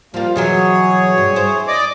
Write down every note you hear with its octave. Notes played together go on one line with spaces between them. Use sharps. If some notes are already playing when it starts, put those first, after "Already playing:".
F3 G3 A#3 F4
B2 E3 F#3 G#4 C#5
G2
E4 C5
D5 D#5 D6